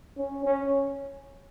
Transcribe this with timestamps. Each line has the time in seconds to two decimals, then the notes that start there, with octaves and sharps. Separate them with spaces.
0.18 C#4
0.45 C#4